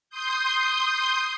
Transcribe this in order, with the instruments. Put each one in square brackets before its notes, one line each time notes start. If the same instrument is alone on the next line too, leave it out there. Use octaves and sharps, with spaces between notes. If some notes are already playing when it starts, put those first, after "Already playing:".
[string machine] C6 D#6 G6